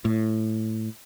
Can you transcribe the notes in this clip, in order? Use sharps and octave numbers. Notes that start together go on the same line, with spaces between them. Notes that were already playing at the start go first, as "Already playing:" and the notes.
A2